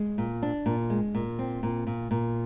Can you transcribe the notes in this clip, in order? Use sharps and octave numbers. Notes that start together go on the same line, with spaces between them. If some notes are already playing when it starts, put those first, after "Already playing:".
Already playing: G#3
A#2
D4
A#2
G#3
A#2
C4
A#2
A#2
A#2